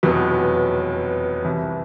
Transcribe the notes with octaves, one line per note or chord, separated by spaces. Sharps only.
F1 E2 B2 F#3
C2 C3 E3